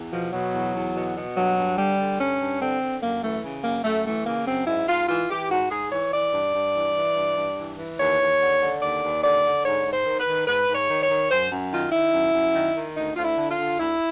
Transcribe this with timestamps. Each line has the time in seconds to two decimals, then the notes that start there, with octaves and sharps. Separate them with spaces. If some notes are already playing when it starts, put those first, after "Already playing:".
Already playing: E2
0.12 B2 F3
0.33 B2 F#3
0.53 E2
0.74 E2
0.95 B2
1.16 B2
1.36 G2 F#3
1.57 G2
1.77 D3 G3
1.98 D3
2.19 G2 C#4
2.39 G2
2.60 D3 C4
2.81 D3
3.02 F#2 A#3
3.23 E3 A3
3.43 C#3
3.64 F#2 A#3
3.84 F#2 A3
4.06 E3 A3
4.26 C#3 A#3
4.46 F#2 C4
4.67 G#2 E4
4.88 G#2 F4
5.09 E3 F4
5.30 E3 G4
5.50 G#2 F#4
5.71 G#2 G#4
5.92 E3 C#5
6.12 E3 D5
6.33 G2
6.54 G2
6.74 E3
6.96 E3
7.16 G2
7.37 G2
7.58 E3
7.78 E3
7.99 D#2 C#5
8.20 D#2
8.40 D3
8.61 D3
8.81 D#2 D5
9.03 D#2
9.23 D3 D5
9.44 D3
9.65 G#2 C#5
9.85 G#2
9.93 C5
10.06 D#3
10.20 B4
10.27 D#3
10.47 G#2 B4
10.69 G#2
10.75 C#5
10.88 D#3
11.02 C#5
11.09 D#3
11.30 F#2 C5
11.51 F#2
11.72 D#3 F4
11.92 D#3 E4
12.13 F#2
12.34 F#2
12.55 D#3
12.75 D#3
12.96 D2 D#4
13.16 D2 F4
13.24 E4
13.37 D3
13.51 F4
13.58 D3
13.79 D2 E4